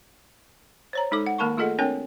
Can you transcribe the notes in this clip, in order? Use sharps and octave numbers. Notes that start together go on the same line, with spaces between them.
C5 C#5 A#5
G#3 D#4 A4 D6
F#5
D#3 A#3 A#4 A5 B5 C#6
A3 F4 G#4 A4 D#5 F#5
C4 D4 A#4 C#5 G5